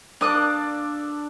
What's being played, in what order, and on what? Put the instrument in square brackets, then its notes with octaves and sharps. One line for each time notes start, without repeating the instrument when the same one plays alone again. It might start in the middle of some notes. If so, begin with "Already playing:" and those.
[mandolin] A#3 D#6 F#6 [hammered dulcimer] D4 A4 D5